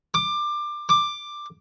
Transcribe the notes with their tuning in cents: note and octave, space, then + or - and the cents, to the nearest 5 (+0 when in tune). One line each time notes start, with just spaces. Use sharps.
D6 +20
D6 +10